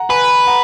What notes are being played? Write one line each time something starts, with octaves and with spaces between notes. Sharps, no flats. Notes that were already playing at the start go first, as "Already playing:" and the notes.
Already playing: F#5 A#5
B4 G#5 B5
F#5 A#5